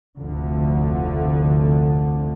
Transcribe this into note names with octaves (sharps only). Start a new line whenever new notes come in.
F1 D2 A2 D3 F3